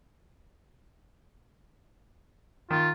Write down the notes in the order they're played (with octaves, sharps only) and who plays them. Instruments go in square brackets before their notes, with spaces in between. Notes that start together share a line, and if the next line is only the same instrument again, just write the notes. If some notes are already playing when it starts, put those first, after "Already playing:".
[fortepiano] D#3 [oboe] F4